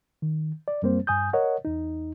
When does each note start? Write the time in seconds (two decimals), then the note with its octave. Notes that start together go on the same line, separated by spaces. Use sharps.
0.22 D#3
0.68 D5
0.82 F#2 G3 A#3 C4 C5
1.07 G2 G#5 D#6 G6
1.33 A#4 C#5 D#5 F#5
1.65 E2 D#4